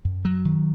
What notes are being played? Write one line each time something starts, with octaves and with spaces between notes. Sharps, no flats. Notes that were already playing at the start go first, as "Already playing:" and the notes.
F#2
F#3
D#3